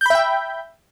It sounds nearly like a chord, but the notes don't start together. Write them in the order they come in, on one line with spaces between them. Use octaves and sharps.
G6 B5 E5 G5